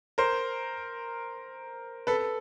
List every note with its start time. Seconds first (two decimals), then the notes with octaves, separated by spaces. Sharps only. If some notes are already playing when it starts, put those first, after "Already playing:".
0.18 A#4 C5
2.07 A4 B4